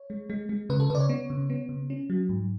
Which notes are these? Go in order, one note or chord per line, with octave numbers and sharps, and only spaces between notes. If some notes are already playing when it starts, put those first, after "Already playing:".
Already playing: C#5
G#3
G#3
G#3
C#3 B4
A4
C#3 B4 D5
C#5
B3
C#3
B3
C#3
C#4
F#3
G#2